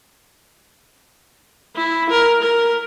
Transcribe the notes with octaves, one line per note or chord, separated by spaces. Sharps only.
E4
A#4
A#4